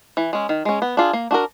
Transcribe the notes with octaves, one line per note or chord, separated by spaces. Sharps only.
E3
G#3 C#4
D#3
G#3 C#4
B3
D4 F4 G#4
A#3
D4 F#4 A#4